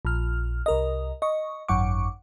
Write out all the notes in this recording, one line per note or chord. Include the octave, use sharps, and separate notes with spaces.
A#1 F6
C2 A#4 D#5
D#5 C#6
G#1 F#2 F#5 C#6 D6